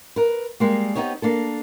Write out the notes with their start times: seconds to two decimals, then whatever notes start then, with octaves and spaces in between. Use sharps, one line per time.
0.16 A#4 B4
0.60 G3 G#3 A#3
0.95 B3 C4 D#4 G4 C#5
1.22 A#3 D4 A4